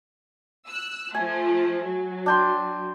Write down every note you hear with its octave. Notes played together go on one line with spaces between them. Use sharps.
E6 F#6
F3 A3 G#5
F#3
D4 G5 C6